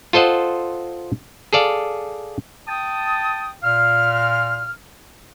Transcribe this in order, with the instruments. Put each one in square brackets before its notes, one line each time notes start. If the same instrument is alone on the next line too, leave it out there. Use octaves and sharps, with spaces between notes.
[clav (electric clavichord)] F4 A4 C5 D#5 F#5
G#4 A4 D5 F5
[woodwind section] G5 A5 D#6
A#2 F5 F6